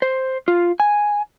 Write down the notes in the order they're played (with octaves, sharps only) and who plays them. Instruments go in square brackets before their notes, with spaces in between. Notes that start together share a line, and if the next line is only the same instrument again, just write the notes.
[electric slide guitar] C5
F4
G#5